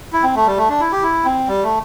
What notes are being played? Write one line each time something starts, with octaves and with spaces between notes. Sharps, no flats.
E4
C4
A3
G3
A3
D4
E4
G4
E4
C4
G3
A3